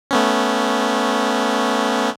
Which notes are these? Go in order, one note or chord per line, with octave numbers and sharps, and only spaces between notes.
A3 B3 C#4